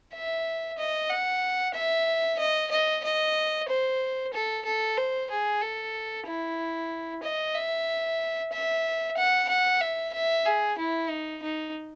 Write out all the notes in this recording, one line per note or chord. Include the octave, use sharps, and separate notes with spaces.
E5
D#5
F#5
E5
D#5
D#5
D#5
C5
A4
A4
C5
G#4
A4
E4
D#5
E5
E5
F#5
F#5
E5
E5
G#4
E4
D#4
D#4